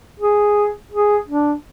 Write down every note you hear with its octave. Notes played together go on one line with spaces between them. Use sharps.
G#4
G#4
D4